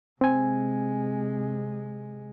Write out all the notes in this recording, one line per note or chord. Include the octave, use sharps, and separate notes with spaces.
C3 G#3 C4 G#5